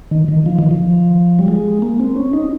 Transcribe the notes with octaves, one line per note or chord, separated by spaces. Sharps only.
D#3
D#3
F3
D#3
F3
G3
G#3
A#3
C4
C#4
D#4